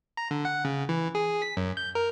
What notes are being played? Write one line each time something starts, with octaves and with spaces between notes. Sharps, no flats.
A#5
D3
F#5
C#3
E3
G#4
B6
F#2
G6
A#4